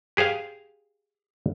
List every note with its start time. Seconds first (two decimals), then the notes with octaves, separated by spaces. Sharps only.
0.17 G4 G#4 C5 F5 G#5